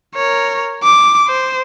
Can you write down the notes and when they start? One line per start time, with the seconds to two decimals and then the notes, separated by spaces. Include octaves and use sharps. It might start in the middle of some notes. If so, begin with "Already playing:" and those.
0.15 A#4 C#5
0.83 D6
1.28 C5